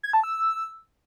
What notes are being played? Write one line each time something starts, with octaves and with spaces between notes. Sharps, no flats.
G#6
A5
E6